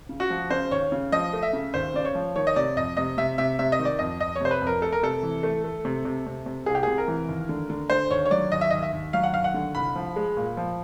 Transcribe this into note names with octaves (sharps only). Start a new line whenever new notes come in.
C#3
F#4
F3
C#3 C5
D#2 C#5
C#3
F3 D#5
A3
E5
C#3
D#2 C5
C#3 D5
C#5
F3
D#3 C#5
D#5
C3 D5
F2 D#5
C3 D#5
C3 E5
C3 E5
C3 E5
D#5
D#3
D5
F2 D#5
F2 D#5
C#5
C3 C5
B4
F2
A#4
A3 A4
A#4
C3 A4
E3
A3
A3
C3
C3
C3
C3
C2 G#4
G4
C3 G#4
A#4
E3
D#2
D3
D3
D3 C5
D#2 C#5
C#5
F#3 D5
D#2 D#5
E5
D#2 D#5
E5
D#2
F#3 F5
F#5
D#2 F5
F#5
D3
C2 B5
F3
G#3
A#2
F3